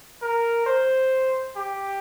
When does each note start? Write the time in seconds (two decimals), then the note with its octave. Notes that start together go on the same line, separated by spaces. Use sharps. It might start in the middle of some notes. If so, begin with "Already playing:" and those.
0.22 A#4
0.66 C5
1.56 G4